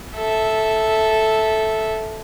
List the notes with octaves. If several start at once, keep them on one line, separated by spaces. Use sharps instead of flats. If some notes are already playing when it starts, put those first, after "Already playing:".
A4 E5